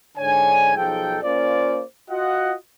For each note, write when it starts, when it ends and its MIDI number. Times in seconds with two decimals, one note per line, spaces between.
0.18 0.74 44
0.18 0.74 50
0.18 0.74 62
0.18 0.74 73
0.18 0.74 80
0.76 1.18 35
0.76 1.18 53
0.76 1.18 63
0.76 1.18 68
0.76 1.18 69
0.76 1.18 79
1.22 1.81 58
1.22 1.81 61
1.22 1.81 65
1.22 1.81 72
1.22 1.81 74
2.10 2.54 65
2.10 2.54 66
2.10 2.54 75
2.10 2.54 78